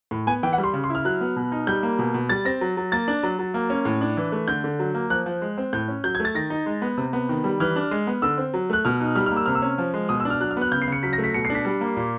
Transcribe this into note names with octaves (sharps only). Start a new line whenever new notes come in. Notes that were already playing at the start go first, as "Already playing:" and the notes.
A2
B3 G#5
E3 G5
F#5
G3
C6
C#3
C6
E4
F6
F#3 F#6
B3
B2
D#4
G3 G6
A#3
B2
B2
G3 A6
C4 A#6
F#3
F#3
A#3 A6
D4
F#3
F#3
A#3
C#4
A2
D4
E3
A3
D3 G6
D3
F#3
A#3
F3 F#6
F3
G#3
C4
A2 G6
C#4
F#3 G6
G#6
A3
A6
D#3 A#6
D#4
G#3
B3
C3
B3
D#3
G3
E3 F6
D4
G#3
B3
D3 E6
C4
F#3
A3 F#6
B2 F6
D#4
G3 F6
F6
A#3
E6
C3 F6
E6
C#4
F3
G#3
B2 D#6
E6
D4
F6
F#3 F#6
F6
B3 F#6
C#3 G6
C7
C#3 C#7
F#3 B6
A#6
A3
B6
B2 C#7
C7
D4
B6
G3
A#3
A#2